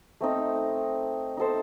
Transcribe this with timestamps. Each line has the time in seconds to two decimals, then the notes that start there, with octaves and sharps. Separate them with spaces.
0.21 A3 C4 D#4
1.37 D#4 A4 C5